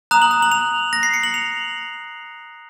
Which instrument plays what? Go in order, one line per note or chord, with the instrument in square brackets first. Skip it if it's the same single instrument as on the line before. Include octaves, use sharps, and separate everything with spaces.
[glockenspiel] A#5 D#6 F#6 F7
F#7
F7
F#7
F7
A#6
C7
C#7
F#7
F7